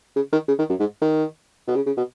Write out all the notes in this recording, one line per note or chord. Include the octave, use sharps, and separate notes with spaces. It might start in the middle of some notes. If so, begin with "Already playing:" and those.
C#3
D#3
C#3
D#3
F#2
G#2
D#3
B2
C#3
C#3
B2